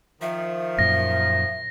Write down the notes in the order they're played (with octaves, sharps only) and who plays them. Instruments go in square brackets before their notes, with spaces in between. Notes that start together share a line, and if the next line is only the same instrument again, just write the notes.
[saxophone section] D#3 F3 [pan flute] E5
[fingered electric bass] F#2 A#2 [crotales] A#6